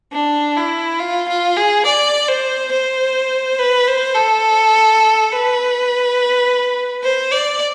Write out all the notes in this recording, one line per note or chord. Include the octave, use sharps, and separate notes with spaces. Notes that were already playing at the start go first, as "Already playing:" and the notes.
D4
E4
F4
F4
G#4
D5
C5
C5
B4
C5
A4
B4
C5
D5